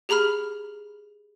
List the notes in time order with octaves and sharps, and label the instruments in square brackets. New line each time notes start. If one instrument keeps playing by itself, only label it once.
[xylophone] G4 G#4 A#5 B5 F6